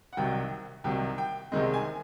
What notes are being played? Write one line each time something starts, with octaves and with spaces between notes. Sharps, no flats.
F#5
C2 C3 D#3 F#3 G5
C2 C3 D#3 F#3 G5
G5
C2 C3 D#3 G#3 C4 D#5
G#5